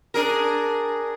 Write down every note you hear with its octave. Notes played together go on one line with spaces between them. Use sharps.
D4 G#4 A#4